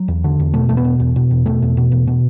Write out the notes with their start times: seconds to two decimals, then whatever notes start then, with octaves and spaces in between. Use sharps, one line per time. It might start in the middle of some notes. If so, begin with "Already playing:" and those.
Already playing: F#3
0.08 E2
0.24 D3
0.39 E2
0.54 B2 A3
0.69 E2 A3
0.77 B3
0.85 B2
1.00 E2
1.16 B2
1.31 E2
1.46 B2 A3
1.62 E2
1.77 B2
1.92 E2
2.07 B2